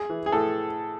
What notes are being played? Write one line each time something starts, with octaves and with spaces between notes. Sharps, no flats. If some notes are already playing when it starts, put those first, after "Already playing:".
Already playing: G#4
E3
G#4
A2 A4